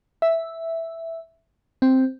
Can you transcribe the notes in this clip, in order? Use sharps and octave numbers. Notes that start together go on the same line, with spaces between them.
E5
C4